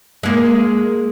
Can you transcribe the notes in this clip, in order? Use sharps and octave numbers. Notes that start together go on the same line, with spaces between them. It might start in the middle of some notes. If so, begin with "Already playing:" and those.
G#3 A#3